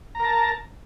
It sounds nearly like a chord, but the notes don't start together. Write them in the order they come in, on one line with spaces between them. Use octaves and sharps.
A#5 A#4 A5